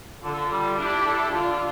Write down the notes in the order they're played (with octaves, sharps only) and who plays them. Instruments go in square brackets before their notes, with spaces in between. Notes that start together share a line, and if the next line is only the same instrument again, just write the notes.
[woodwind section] D3 [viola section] F4 A4
[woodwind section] G3
[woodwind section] D4 [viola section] E4 G4
[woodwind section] A4
[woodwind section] D3 [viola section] D4 F4